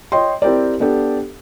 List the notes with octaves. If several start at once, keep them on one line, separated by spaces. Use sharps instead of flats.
C#5 D#5 G5 C6
C4 E4 G4 A#4 D5
B3 D4 G4 A4